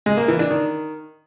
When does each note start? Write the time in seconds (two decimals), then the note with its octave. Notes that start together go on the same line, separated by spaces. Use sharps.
0.06 G#3
0.17 A#3
0.28 E3
0.39 D4
0.50 D#3